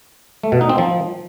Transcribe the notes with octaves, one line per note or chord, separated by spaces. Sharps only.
A3
B2
D#4
C4
F3